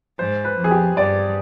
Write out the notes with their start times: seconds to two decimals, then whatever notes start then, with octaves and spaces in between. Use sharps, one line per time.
0.19 G#2 C5
0.45 B4
0.59 F2
0.64 G#4
0.71 G4
0.96 G2 D5